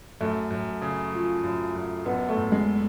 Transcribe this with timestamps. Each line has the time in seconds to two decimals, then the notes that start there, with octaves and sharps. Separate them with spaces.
0.21 F#2 A3
0.51 F#2
0.82 C#3
1.13 F3
1.43 F#2
1.75 F#2
2.05 F#1 B3
2.29 A3
2.37 F#1
2.52 G#3